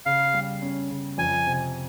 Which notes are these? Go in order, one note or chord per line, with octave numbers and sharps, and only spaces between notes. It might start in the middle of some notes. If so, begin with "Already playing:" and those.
C#3 F5
G3
C#4
C#3
F2 G#5
C3